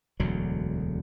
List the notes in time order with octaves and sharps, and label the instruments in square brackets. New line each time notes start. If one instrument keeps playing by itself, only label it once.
[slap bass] E1 D2 D3 F#3